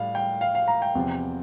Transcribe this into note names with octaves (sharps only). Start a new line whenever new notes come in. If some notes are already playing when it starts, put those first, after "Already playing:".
Already playing: A2 G3 F5
G5
F5
F5
A#5
G5
E2 C3 F3